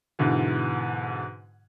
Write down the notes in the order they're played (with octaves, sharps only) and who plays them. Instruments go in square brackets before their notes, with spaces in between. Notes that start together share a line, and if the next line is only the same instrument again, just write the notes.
[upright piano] G#2 B2 D3 E3